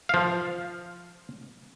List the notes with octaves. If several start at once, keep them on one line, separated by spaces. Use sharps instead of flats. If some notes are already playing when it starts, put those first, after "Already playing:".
F3 F5